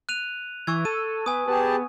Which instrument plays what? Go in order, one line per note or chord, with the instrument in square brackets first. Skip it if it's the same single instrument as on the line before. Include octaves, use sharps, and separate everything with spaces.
[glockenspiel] F#6 D#7 F7
[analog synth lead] E3 [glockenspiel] C#6 E6 G#6
[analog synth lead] A4 [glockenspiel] D#7
[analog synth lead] B3 [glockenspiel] G#5 D#6
[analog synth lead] B3 [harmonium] G4 G#4 A5